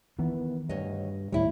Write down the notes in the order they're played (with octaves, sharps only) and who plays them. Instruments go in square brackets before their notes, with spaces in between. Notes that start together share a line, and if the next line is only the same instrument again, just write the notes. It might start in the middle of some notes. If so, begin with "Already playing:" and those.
[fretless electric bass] D#3 E3 B3
[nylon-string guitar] D2 C#5 D#5 [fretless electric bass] G2
[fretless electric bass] D#2 A2 G3 [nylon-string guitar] E4 C#5